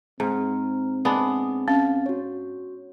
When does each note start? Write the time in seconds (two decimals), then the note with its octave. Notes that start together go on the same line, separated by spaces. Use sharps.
0.20 G#2 C4 A#5 F6
1.05 G#3 B3 D4 D#6
1.68 C#4 F5
2.06 F#4 C#5